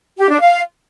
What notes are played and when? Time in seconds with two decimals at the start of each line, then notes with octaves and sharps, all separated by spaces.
0.18 G4
0.30 D4
0.41 F5